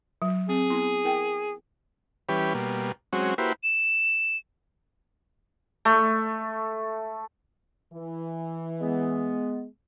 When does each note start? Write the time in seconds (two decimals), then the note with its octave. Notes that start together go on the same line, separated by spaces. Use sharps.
0.22 F#3
0.49 C4 G#4
0.70 B3 E4 C6
1.04 E4 A#4 G5
2.29 E3 G3 C#4 G4 B4
2.54 B2 G3 A#3
3.13 F#3 G#3 C4 C#4 F#4
3.38 A#3 E4 F#4 G4 B4 C5
3.63 E7
5.85 A3
7.92 E3
8.81 G#3 B3